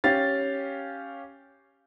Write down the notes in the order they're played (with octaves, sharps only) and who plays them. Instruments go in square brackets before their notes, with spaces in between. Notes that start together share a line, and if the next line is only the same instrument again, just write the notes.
[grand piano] C#4 G4 F5 A6